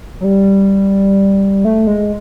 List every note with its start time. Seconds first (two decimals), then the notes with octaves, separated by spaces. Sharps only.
0.20 F#3
0.24 G3
1.65 A3
1.87 G#3